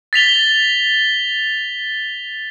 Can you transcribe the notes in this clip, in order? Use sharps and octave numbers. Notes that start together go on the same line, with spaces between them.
A6 B6 F7 G7